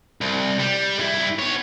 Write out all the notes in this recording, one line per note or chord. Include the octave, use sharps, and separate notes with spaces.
C2
G3
G2 E4
B3 C#5